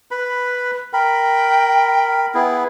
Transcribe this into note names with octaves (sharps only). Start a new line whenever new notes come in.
B4 B5
A#4 G5 B5
B3 E4 G#4